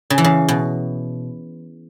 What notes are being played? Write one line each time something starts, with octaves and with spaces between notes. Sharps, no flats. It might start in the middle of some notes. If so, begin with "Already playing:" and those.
C#3
E3
C#3
B2